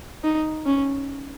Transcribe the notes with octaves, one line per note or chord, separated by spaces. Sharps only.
D#4
C#4